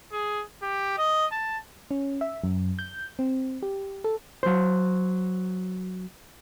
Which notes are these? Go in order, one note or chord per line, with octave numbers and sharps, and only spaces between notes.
G#4
G4
D#5
A5
C#4
E5
F#2
G6
C4
G4
A4
F#3 C5